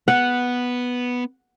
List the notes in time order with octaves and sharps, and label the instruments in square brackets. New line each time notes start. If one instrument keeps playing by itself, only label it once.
[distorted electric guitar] B3 [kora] F#5